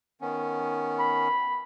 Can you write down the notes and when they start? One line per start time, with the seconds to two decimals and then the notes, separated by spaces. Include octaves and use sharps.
0.21 D#3 B3 C#4
0.99 B5